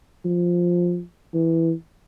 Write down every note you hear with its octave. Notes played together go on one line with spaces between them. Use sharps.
F3
E3